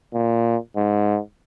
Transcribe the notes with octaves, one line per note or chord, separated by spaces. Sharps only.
A#2
G#2